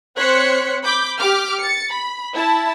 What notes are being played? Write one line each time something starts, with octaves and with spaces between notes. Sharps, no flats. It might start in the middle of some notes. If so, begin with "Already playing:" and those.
C4 C5 C#5 F#6 B6 C#7
B5 D6 G6
G4 D6 F6
A6 C#7
B5
E4 A5